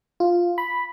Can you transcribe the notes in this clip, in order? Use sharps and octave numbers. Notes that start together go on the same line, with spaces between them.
F4
B5